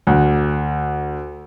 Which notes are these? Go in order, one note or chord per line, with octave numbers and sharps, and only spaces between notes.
D2